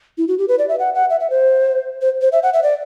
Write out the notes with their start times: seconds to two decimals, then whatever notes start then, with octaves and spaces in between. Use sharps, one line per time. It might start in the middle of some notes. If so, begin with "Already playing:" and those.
0.18 E4
0.28 F#4
0.38 G4
0.48 B4
0.59 D5
0.69 E5
0.79 F#5
0.95 F#5
1.10 E5
1.20 E5
1.30 C5
2.02 C5
2.22 C5
2.32 E5
2.43 F#5
2.53 E5
2.63 D5